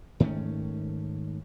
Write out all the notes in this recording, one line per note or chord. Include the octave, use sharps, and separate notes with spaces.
G#2 D#3 A3 C#4